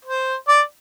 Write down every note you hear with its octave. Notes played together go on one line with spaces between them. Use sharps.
C5
D5